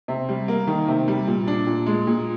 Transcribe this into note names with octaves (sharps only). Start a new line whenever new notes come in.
C3
G3
A#3
D#3
C3
G3
A#2
D4
A#2
G#3
A#2